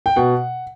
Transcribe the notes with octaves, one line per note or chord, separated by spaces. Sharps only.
G5
B2 F#5